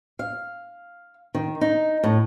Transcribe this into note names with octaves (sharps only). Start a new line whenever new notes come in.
F5
D#3
D#4
A2